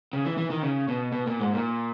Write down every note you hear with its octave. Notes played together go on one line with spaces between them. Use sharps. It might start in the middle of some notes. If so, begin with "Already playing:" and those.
C#3
E3
E3
D#3
C#3
B2
B2
A#2
G#2
A#2